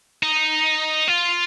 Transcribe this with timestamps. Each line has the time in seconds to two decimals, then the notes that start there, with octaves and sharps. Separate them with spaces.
0.23 D#4
1.08 F4